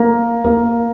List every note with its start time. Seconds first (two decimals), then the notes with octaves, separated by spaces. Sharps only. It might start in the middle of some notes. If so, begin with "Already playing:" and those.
Already playing: A#3
0.45 A#3